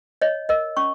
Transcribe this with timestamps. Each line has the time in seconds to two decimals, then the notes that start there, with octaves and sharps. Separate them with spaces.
0.22 C#5 D#5
0.49 A#4 D#5
0.77 C#4 C#6